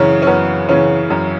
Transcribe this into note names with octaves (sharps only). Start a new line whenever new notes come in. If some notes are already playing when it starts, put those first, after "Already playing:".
Already playing: F#2 C#3 E3 C#4
C#4
F#2 B3
C#3 E3 C#4
F#2